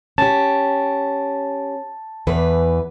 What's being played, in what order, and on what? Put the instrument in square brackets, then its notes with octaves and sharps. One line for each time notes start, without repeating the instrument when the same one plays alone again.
[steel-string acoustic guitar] C#4 G4 [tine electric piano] A5
[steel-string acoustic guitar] E2 E3 B4